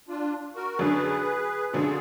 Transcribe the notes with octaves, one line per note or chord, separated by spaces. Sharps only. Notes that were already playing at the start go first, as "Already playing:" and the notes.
D4 F4
F#4 A#4
F#2 D3 F#3 D4 G#4 B4
F#2 D3 F#3 D4 F4 G#4